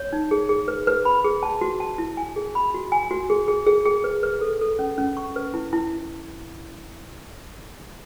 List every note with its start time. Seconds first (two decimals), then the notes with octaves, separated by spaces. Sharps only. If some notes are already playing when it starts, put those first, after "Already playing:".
Already playing: C#5
0.13 D#4
0.31 G#4
0.49 G#4
0.68 B4
0.87 B4
1.05 B5
1.25 G#4
1.43 A5
1.61 F#4
1.80 A5
1.98 E4
2.17 G#5
2.36 G#4
2.55 B5
2.74 F#4
2.92 G#5
3.11 F#4
3.30 G#4
3.48 G#4
3.67 G#4
3.86 G#4
4.04 B4
4.23 B4
4.41 A4
4.61 A4
4.79 C#4
4.98 C#4
5.17 C#6
5.36 B4
5.54 E4
5.73 E4